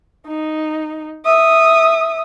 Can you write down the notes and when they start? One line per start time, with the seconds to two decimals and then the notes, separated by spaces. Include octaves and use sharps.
0.27 D#4
1.25 E5 D#6